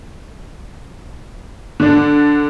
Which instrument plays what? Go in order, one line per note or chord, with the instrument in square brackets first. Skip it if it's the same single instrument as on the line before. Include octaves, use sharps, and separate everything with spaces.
[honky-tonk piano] D3 D4